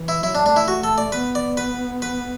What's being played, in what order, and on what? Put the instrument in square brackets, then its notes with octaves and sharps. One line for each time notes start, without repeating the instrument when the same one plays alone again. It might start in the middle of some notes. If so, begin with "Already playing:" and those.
Already playing: [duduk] E3
[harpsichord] E4
[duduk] F#3 [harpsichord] E4
[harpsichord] D4
[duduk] A3 [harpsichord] D4
[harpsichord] E4
F#4
A4
D5
[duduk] B3 [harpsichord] B4
[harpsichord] D5
B4
B4